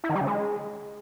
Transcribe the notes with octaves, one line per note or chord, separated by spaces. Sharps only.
E4
D#3
G3
C#3
G#3